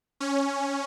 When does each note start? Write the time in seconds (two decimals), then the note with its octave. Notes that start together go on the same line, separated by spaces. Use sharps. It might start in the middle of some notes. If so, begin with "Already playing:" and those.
0.20 C#4